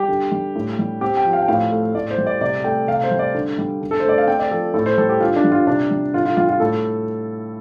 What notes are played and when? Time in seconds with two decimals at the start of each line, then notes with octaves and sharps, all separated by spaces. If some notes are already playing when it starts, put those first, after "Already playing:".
Already playing: G3 G4
0.08 D3
0.32 G3
0.56 A2
0.79 G3
1.01 C4 G4
1.17 G5
1.25 F3
1.33 F5
1.42 G5
1.48 A2 F5
1.72 A3
1.95 A2 D5
2.11 C5
2.18 G3
2.27 D5
2.41 C3 D5
2.64 A3 G5
2.88 C3 F5
3.04 C5
3.11 G3
3.19 D5
3.34 D3
3.58 G3
3.81 D3
3.91 A4
4.00 C5
4.04 A3 D5
4.18 F5
4.28 C4 G5
4.39 D5
4.51 F3 A4
4.74 A2 A4
4.86 C5
4.98 G3 A4
5.09 G4
5.21 D3 F4
5.36 D4
5.44 G3
5.52 F4
5.67 C3 D4
5.91 G3
6.14 D3 F4
6.26 F4
6.37 G3 F4
6.49 F4
6.60 A2 A4